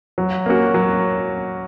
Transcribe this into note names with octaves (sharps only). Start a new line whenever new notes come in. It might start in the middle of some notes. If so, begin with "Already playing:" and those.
F#3
A#3 C#4 F#4
F#3